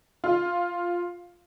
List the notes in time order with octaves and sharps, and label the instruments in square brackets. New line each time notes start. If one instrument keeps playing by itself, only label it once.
[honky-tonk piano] F4